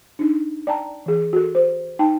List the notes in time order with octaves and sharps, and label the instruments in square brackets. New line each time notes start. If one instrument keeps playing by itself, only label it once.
[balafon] D4 D#4
D5 G5 A5 A#5
E3 G#4
F#4 A4
C5
D#4 G5 A5